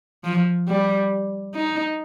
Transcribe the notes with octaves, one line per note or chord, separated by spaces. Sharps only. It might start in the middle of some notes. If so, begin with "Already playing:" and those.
F3
G3
D#4